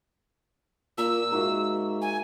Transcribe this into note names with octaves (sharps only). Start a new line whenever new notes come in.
A#2 A#5 E6
G#2 A#3 F#4 E5
G#5